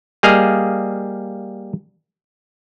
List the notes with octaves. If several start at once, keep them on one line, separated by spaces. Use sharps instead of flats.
G3 A#3 G#4 D#5 F5